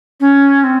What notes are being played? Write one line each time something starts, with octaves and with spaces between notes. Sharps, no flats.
C#4
C4